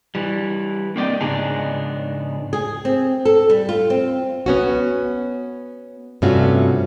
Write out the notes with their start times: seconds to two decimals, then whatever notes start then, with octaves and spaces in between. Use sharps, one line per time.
0.15 E3 G3
0.96 A#3 C4 D5 D#5 G5
1.21 G#2 C#3 B3 D4 D#4 G#4
2.53 G#4
2.85 C4
3.25 A4
3.50 G3
3.69 F4
3.90 C4
4.46 B3 C#4 F#4
6.22 G2 C3 A3 C#4 F4 F#4